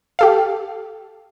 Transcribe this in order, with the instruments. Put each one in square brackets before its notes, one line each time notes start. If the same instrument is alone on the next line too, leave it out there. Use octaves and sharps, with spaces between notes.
[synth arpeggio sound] G4 A4 F5